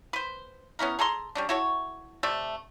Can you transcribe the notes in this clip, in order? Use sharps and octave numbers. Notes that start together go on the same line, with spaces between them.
B4 C5
B3 C#4 E4 A#4
G#4 A4 A#5 C6
G3 C#4 D4
E4 F#4 A4 C#5
C3 A3 D5 E5